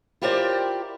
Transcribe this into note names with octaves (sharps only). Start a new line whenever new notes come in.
E4 F4 G4 A#4 C5 D5